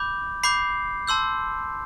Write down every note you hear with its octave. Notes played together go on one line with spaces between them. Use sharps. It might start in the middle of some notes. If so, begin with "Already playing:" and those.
Already playing: B5 D6 G6
B5 D6 G6 C7
A5 C6 E6 G6